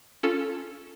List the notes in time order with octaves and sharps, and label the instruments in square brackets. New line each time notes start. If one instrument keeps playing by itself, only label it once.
[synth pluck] C#4 F4 A4